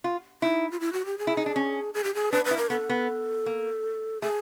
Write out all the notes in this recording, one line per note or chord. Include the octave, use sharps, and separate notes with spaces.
F4
D#4 E4
F4
E4
F#4
G4
G#4
E4
D#4
D4
C#4
G#4
G4
G#4
D4 B4
B4
E4
A#4
B3 A4
B3
A#3
A3 G#4